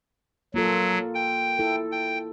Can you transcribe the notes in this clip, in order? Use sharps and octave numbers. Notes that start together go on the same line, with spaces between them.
F#3 A#3 F4 A4
G5
E4 A4
G5